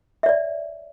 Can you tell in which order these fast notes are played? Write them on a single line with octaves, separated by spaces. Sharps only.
E5 C#5 D5